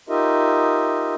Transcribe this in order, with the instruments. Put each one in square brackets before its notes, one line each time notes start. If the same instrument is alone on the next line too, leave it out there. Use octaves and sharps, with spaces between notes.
[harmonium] D#4 F4 G4 A#4 D#5 E5